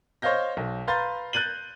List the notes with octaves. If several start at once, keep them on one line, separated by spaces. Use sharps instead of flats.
C5 C#5 D#5 F5 G6 A#6
B1
B4 F5 A#5 C6 G6 A6
F#6 G6 A6 D#7 F#7